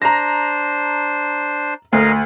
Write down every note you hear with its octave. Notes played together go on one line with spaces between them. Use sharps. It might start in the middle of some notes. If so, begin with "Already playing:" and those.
D4 C5 A#5 A#6
D2 A#4 D#5 F5